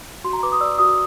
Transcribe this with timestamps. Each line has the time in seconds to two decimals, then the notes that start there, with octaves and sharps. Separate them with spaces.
0.24 F#4 C6
0.33 A#5
0.43 B4 D6
0.52 D#6
0.61 D5 E6
0.78 F#4 D#6